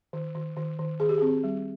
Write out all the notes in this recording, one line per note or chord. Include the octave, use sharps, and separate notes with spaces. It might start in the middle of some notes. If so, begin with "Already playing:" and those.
D#3
D#3
D#3
D#3
D#3 G#4
G4
C4 G#4
G3